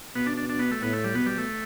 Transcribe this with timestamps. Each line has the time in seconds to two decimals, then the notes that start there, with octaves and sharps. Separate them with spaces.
0.15 B2 B3
0.26 D4
0.37 D4
0.49 D4
0.59 B3
0.71 A3
0.82 A2 B3
0.93 A3
1.04 G3
1.15 B2 B3
1.26 G3
1.38 A3